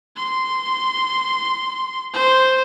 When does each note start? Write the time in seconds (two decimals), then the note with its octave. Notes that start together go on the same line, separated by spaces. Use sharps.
0.17 C6
2.13 C5